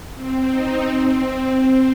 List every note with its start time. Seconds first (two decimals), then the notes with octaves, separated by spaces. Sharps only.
0.16 C4
0.49 D#4
0.84 C4